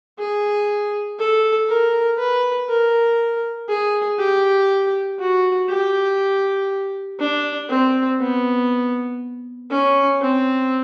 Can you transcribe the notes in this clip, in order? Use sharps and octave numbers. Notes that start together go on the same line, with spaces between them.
G#4
A4
A#4
B4
A#4
G#4
G4
F#4
G4
D4
C4
B3
C#4
C4